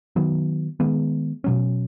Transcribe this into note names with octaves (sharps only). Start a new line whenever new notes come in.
D#3 F#3 B3
D#3 G#3 B3
B2 F#3 C#4